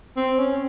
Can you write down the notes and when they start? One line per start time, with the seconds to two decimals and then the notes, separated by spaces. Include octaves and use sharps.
0.16 C4
0.39 C#4